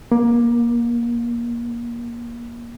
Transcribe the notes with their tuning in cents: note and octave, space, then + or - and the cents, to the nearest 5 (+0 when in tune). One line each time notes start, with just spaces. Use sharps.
A#3 +20